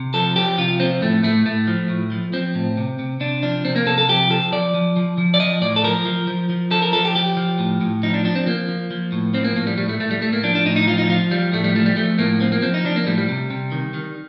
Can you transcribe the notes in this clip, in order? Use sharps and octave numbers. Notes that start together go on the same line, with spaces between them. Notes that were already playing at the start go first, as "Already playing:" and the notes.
Already playing: C3
F3 A4
F3 G4
C3 F4
F3 C4
A2 A3
A2 A3
A2 A3
F3
A2
F3
F3 C4
A2
C3
C3
C3 D4
F3 D4
C3 C4
A#3
C3 A4
A4
F3 G4
F3 A4
F3 D5
F3
F3
F3
D5
F3 D#5
A2 D5
A4
F3 A#4
F3
F3
F3
F3 A4
A#4
F3 A4
G4
F3 G4
F3
A2
A2
F3 D#4
D4
F3 D4
C4
F3 A#3
F3
F3
A2
F3 C4
A#3
A2 A#3
G3
A2 G3
A3
A2 A3
G3
A2 A3
A#3
F3 D4
D4
A2 D#4
D#4
F3 F4
D#4
F3 F4
F3 G3
A2 A3
G3
F3 A3
G3
F3 A3
A2 A#3
F3 C4
A#3
F3 C4
D#4
F3 D4
A#3
A2 G3
G3
C3
C3
D#3
D#3